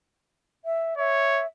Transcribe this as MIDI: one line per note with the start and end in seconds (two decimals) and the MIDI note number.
0.64 0.97 76
0.97 1.42 73
0.97 1.46 76